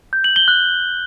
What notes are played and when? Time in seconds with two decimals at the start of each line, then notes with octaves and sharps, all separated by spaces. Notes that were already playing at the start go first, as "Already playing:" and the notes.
0.13 G6
0.24 F#7
0.36 G7
0.48 F#6